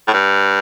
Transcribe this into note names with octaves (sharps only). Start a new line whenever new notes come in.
A2
G2